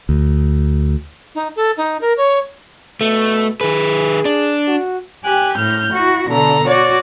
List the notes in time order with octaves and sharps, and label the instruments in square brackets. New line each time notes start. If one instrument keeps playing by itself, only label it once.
[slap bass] D2
[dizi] D#4
A4
D#4
A#4
C#5
[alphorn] B2 [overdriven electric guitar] A3
[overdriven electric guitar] D#3 B4 [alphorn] G#4
[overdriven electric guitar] D4
[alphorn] F#4
[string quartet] G4 G#5 F#6
A2 F6 G6
E4 F#4
B2 D3 A4 A#5
F#4 C#5 D5